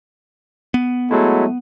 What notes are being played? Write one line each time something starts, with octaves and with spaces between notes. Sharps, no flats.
B3
F#3 G#3 A3 E4